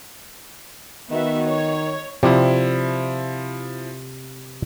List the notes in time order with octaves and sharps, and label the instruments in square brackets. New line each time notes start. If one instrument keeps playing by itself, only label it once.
[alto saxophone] D#3 [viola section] B3 F#4 E5
[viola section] C#5
[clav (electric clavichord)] C3 G4 D5 [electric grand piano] F3 E4